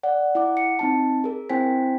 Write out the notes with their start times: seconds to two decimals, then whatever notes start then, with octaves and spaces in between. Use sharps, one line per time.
0.03 D5 F#5
0.35 E4 F#5 D6
0.57 C#7
0.79 C4 D#4 A5
1.24 G#4 A#4
1.49 C4 E4 C5 G5 G#5 B6